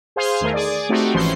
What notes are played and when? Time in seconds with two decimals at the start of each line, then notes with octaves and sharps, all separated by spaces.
0.16 G#4 C5 F5 C6
0.41 E2 D#3 A3 G#4 A#4
0.54 G#4 D5
0.89 A3 C4 D#4 F#4 G4
1.14 G#1 E3 F3 C#4 C5 C6